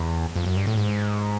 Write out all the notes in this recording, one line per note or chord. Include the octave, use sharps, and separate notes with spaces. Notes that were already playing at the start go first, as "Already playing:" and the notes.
Already playing: E2
F2
F#2
G2
A2
G#2